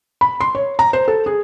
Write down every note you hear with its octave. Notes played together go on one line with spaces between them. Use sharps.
B5
C6
C#5
A#5
C5
A4
G#4